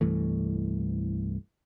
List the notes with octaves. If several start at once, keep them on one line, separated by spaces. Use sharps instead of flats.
C2 G2 E3 A3